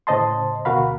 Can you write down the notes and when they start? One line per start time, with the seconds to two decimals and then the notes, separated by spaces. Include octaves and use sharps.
0.07 A2 C#3 C5 D#5 A5 C6
0.65 D2 B2 F#4 A#4 F5 B5